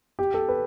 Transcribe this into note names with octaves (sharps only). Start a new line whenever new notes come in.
G4
A4
B4